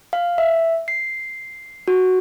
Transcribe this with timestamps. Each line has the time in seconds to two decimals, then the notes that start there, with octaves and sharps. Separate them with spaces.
0.13 F5
0.38 E5
0.88 C7
1.88 F#4